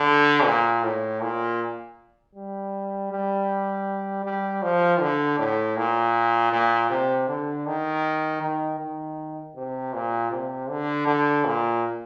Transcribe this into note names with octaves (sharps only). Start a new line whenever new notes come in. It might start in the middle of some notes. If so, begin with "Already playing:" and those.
Already playing: D3
A#2
A2
A#2
G3
G3
G3
F3
D3
A2
A#2
A#2
C3
D3
D#3
D#3
D#3
C3
A#2
C3
D3
D3
A#2